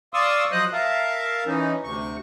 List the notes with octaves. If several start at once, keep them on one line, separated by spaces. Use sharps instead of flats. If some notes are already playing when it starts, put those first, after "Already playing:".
D5 F5 C6 C#6 D#6 E6
F3 F#3 C5 D#5 D#6 F#6
A#4 E5 F5 A5
E3 C#4 D#4
D2 C3 C#6